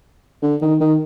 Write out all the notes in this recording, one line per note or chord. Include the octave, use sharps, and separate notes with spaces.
D3
D#3
D#3